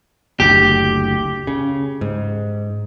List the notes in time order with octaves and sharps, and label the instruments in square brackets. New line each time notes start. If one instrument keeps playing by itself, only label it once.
[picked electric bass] F#1 D2 [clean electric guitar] G4
[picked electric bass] C#3
G#2